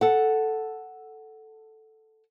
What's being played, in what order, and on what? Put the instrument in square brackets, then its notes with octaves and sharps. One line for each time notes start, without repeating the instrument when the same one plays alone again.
[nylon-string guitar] A4 F#5